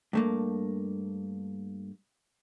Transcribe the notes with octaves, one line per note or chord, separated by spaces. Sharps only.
G2 A3 A#3